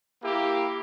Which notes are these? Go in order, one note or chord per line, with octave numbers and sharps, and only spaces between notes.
A#3 E4 G4